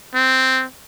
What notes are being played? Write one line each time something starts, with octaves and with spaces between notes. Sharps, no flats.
C4